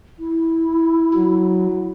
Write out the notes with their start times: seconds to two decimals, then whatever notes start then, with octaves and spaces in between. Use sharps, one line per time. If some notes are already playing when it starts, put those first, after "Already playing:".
0.19 E4
1.14 F#3